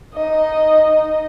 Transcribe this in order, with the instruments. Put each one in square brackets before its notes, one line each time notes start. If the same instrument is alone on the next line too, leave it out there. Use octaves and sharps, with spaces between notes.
[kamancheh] D#4 D#5